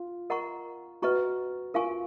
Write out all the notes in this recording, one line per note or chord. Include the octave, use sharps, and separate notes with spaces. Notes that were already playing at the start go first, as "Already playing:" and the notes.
Already playing: F4
A#4 D#5 F#5 A#5 C#6
F#4 B4 D#5 A#5 C#6
F4 A#4 F5 G#5 C#6